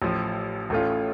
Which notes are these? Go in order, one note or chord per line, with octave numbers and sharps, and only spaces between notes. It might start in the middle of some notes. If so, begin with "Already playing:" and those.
A1 A2 F3
A1 A2 A3 C#4 F4